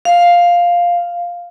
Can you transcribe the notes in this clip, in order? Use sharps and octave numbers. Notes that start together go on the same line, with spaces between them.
F5